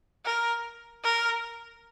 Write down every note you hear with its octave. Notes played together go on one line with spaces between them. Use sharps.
A#4
A#4